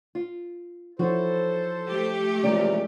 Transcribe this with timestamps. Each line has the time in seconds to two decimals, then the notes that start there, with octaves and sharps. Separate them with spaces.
0.15 F4
0.99 F3 C#4 E4 F#4 A4 C5
1.88 A3 G4
2.43 C3 E3 F3 G#3 C#4 A#4 D5